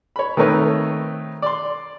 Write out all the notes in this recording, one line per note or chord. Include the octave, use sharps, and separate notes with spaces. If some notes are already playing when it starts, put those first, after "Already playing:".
C#5 B5
D#3 A3 C4 A#4 B4 C#5
D5 C6